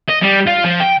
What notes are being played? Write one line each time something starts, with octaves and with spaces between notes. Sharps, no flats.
D#5
G3
F4
F3
G5